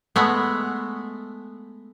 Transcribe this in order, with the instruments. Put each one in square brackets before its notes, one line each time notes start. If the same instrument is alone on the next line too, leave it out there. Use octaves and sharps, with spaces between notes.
[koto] G#3 A3 B3